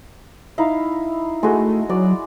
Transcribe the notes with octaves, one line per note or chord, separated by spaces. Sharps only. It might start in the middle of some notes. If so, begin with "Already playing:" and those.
D#4 E4 F5
G#3 A3 F#4
F#3 D5